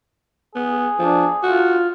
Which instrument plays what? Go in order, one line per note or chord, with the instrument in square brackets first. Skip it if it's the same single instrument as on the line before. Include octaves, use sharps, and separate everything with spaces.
[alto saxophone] B3 [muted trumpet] G#4
[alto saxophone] F3 [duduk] D4
[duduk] F4 [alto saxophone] F#4